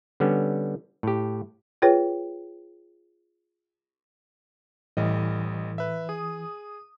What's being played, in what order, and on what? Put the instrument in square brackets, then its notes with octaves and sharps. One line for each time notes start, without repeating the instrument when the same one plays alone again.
[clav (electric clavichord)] D3 G3 B3 C#4
A2 G4
[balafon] F4 G#4 B4 C#5 G5
[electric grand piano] A1 G3 D#5 [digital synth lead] A2 [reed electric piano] E3
[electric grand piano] B4 E5
[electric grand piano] G#4 [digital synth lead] D#6